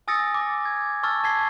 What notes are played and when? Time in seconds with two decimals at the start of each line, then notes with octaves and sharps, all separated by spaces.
0.08 G#5 D#6 E6 A6 A#6 C#7
0.34 D6
0.65 G#6
1.03 A5 C#6 E6 F6 A6
1.24 A5 E6 G#6 B6 C7 G7